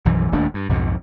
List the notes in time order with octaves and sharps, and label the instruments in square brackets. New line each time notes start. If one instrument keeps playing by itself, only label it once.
[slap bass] B1 F#2 E3 F3
D#1 D#2 A3 D4
G2
B1 F2 G#2 B2